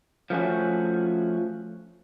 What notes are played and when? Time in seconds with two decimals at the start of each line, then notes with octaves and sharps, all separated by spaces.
0.30 F3 A3 C#4 F#4